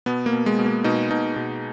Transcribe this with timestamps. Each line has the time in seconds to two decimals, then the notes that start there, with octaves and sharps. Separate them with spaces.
0.06 B2 B3
0.26 A#3
0.33 B2
0.46 G#3
0.59 B2
0.66 A#3
0.84 B2 D#4
1.10 B2 D#4
1.36 B2